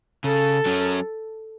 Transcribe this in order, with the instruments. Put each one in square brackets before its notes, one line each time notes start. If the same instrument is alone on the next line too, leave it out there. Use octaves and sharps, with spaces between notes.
[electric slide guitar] C#3 [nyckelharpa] A4
[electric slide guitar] F#3 C#4